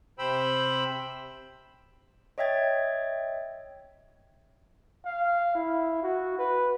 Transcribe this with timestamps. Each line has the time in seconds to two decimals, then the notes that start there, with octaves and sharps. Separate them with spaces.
0.19 C3 C5 G5 B5 E6
2.38 C#5 D#5 E5 G5 G#6 A6
5.05 F5
5.55 E4
6.03 F#4
6.39 B4